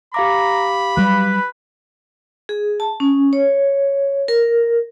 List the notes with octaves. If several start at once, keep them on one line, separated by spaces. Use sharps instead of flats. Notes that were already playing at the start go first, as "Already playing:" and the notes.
G4 F5 A#5 B5 D6
F#3 G3 B4
G#4
A5
C#4
C#5
A#4